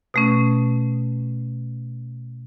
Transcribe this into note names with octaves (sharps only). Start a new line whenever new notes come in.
B2 A3 C#4